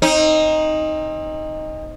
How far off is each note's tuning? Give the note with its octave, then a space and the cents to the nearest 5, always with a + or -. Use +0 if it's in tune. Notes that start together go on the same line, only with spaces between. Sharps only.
C4 +35 D#4 +0